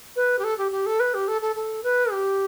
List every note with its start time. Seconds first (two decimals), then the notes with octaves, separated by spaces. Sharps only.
0.16 B4
0.39 G4
0.44 A4
0.58 G4
0.72 G4
0.86 A4
1.00 B4
1.14 G4
1.28 A4
1.41 A4
1.56 A4
1.84 B4
2.12 G4